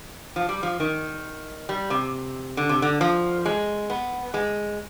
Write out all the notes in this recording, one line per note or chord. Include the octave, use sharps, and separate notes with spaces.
F3
G3
F3
D#3
G3
C3
D3
C3
D3
F3
G#3
B3
G#3